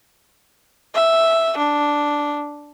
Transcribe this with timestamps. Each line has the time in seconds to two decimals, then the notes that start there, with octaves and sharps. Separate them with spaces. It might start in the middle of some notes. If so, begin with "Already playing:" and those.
0.94 E5
1.57 D4